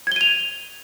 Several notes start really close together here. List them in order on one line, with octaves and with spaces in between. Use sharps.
G#6 G7 D#7 F7